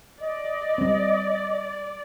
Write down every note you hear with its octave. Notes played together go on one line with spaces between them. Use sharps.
D5 D#5
G3 C4